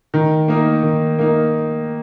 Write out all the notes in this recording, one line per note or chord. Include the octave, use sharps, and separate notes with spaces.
D#3
A#3 D#4 A#4
D#3
A#3 D#4 A#4